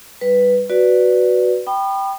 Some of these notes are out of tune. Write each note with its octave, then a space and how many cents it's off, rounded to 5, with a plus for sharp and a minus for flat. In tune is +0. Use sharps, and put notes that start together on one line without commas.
G3 +0 B4 +0
F#4 +5 B4 +0 D5 +0
G5 -5 B5 +0 D#6 -45